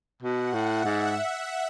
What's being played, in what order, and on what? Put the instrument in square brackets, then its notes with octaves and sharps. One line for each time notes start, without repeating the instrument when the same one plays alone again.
[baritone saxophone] B2 [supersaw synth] F#5
[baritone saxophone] A2
[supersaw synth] E5
[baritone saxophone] G#2